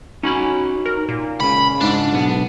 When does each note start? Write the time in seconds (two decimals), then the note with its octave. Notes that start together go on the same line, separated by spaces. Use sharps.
0.23 C#4 D#4 F#4 B5
0.85 A#4
1.09 A#2
1.40 C#2 C#3 B5
1.81 G#2 D4
2.13 B1 B3